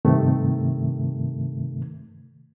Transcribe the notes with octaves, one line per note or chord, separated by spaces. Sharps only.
G2 C3 D#3 A3